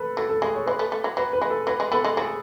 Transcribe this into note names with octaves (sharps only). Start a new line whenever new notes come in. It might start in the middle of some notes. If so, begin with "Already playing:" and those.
Already playing: A4 B4
F#3 A4
A4
G#3 G#4
C#5
G#3 B4
A3
A3
F#3
F#3 B4
B4
G#3
A4
F#3 B4
G#3
B3 A4
G#3
F#3 G#4